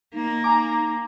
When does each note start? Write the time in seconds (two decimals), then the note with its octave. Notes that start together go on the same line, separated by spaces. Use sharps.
0.14 A#3 D#4
0.44 G#5 A#5 D6